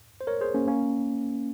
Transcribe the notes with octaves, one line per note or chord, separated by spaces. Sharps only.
C5
A#4 C#5
G#4 C5
A#3 C#4
A#3 C#4